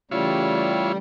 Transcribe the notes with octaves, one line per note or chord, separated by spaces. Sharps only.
C#3 E3 G3 A3 E4 F4 C#5